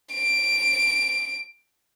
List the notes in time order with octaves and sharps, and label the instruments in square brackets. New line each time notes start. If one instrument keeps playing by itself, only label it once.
[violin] D7